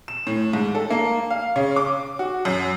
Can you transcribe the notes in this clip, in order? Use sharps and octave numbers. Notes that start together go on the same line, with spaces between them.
E7
A2
G#2
A4
A#3
F5
C#3
D6
F#4
F#2